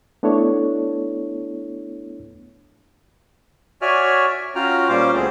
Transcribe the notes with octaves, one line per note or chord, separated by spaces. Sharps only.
A3 B3 D4 E4 A4 C#5
F#4 C#5 D5 E5 G#5 F6
C#4 F4 F#4 G5 A#5 F6
A#2 G3 C#4 F4 C5 D6
D2 A3 B3 C4 G#4 C5